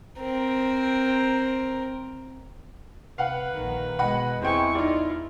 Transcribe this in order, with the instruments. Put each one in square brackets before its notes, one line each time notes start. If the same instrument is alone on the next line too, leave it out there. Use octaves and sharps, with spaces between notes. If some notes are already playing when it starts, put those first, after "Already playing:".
[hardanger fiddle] C4 A#4
[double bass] C3 [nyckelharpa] B4 [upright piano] F5 F#5
[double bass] A#1 D#3
[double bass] B2 G#3 [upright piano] D#5 F#5 B5
[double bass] E2 E4 [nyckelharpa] G#3 C#6 [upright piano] C4 G5
[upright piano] D#4 D5 [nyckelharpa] F4